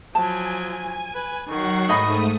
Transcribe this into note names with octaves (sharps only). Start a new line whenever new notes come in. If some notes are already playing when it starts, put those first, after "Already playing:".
F3 F#3 G#5 A5
B4
D#3 F#3 F#5 C#6 C7
G#2 A3 D#4 D#5 B5 D#6